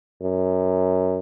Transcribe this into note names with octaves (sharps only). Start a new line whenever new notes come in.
F#2